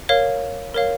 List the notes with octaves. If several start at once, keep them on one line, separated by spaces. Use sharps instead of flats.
A#4 C#5 F5
A#4 C#5 F5